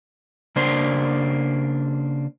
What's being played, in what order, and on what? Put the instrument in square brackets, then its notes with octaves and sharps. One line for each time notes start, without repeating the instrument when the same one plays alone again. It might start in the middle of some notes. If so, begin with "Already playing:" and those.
[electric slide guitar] C#3 A#3 D4 C5